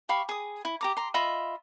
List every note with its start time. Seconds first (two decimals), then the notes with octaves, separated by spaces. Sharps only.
0.09 G4 F5 B5 C#6
0.29 G#4 D#6
0.65 E4
0.81 G4 A#5 D6
0.97 A#5 C6
1.14 F4 D#5 E5 B5